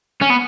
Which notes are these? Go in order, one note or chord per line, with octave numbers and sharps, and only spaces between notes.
C#4
B3